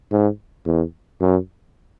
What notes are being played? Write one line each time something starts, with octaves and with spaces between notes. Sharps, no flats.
G#2
E2
F#2